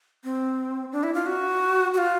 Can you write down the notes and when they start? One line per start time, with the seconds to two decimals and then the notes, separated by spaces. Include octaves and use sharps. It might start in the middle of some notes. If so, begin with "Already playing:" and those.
0.24 C4
0.92 D4
1.03 E4
1.14 F4
1.26 F#4
1.94 F#4
1.98 F4